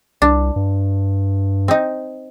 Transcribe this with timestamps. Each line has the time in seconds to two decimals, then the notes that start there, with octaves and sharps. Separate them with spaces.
0.22 C2 D4
0.56 G2
1.68 C4 D#4